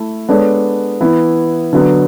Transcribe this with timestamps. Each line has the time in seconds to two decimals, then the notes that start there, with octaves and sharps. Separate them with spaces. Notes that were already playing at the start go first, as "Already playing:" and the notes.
Already playing: A3 E4
0.29 G#3 B3 D4 A4 C#5
1.01 E3 B3 E4
1.73 D3 F#3 B3